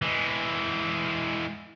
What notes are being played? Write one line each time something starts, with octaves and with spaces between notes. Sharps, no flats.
E3 G#3